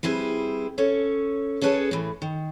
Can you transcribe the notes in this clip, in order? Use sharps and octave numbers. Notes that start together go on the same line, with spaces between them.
G3 C4 E4 G#4 B4
C#4 A4 C#5
C#4 G#4 A4 B4 C#5 A5
A2 E3
D#3